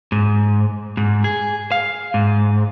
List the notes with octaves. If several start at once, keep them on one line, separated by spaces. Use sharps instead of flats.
G#2
G#2
G#4
F5
G#2